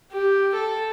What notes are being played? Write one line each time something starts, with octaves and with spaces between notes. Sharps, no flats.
G4
A4